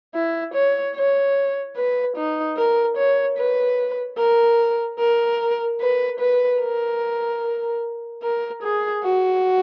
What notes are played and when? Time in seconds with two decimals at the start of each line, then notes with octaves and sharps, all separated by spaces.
0.15 E4
0.54 C#5
0.96 C#5
1.76 B4
2.16 D#4
2.57 A#4
2.97 C#5
3.38 B4
4.19 A#4
4.99 A#4
5.81 B4
6.20 B4
6.61 A#4
8.23 A#4
8.63 G#4
9.04 F#4